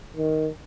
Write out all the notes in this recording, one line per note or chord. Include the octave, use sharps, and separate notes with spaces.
D#3